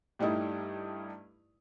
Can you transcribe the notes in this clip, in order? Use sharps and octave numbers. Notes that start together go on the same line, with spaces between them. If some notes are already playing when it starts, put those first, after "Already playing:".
G2 G3 A3 D#4 E4